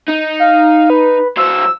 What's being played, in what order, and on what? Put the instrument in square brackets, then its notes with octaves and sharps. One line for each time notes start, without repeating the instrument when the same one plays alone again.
[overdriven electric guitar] D#4
[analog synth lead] F5
B4
[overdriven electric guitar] F#3 C5 [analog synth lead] E6